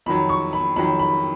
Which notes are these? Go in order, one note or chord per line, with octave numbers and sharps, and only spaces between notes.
F2 D#3 F#3 B5
C#6
B5
F2 D#3 F#3 B5
B5